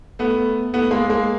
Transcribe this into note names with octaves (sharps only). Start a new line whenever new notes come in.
A3 B3
A3 B3
G#3 A#3
G#3 A#3